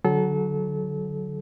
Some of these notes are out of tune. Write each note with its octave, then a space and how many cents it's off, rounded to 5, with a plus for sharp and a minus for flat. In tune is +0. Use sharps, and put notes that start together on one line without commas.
D3 +0 F#3 +0 A4 -30